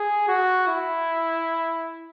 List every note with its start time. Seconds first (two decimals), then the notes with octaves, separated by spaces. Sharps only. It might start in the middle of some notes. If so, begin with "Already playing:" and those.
Already playing: G#4
0.28 F#4
0.68 E4